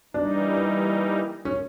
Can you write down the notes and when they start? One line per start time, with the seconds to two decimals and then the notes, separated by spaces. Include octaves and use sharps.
0.14 E3 G3 A#3 D4 D#4
1.45 C#4